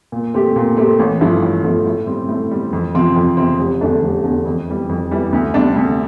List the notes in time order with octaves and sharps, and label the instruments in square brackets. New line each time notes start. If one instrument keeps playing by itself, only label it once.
[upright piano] A#2
A3 C4 G4
A#2
A3 C4 G4
A1
G2 F3 A3 E4
A1
G2 F3 A3 E4
A2
G3 C4
A2
G3 C4
F2
C3 F3 C4
F2
C3 F3 C4
F1
E2 D3 A3 D4
F1
E2 D3 A3 D4
F2
E3 G3
F2
E3 G3
D2
C3 G3 D4
D2